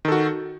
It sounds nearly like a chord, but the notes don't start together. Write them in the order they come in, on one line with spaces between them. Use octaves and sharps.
D#3 A4 F#4